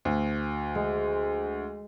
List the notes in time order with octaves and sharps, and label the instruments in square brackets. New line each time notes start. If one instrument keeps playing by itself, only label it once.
[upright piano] D2
[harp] G#3